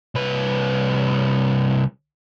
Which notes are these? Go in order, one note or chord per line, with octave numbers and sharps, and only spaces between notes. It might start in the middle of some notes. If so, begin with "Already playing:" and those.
C2 B4